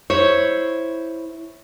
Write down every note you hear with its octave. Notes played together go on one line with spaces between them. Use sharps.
E4 C5 C#5